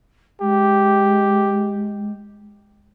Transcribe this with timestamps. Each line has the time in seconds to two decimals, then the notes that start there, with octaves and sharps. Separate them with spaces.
0.41 G#3 G4